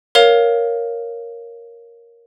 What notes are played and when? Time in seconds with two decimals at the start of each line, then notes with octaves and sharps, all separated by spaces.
0.15 A#4 C#5 F5 F7